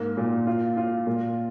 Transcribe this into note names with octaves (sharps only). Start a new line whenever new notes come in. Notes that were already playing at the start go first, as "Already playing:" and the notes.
Already playing: G#2 A#3
A#2
F4
F4
A#2